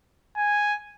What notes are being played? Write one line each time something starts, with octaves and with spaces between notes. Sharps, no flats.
G#5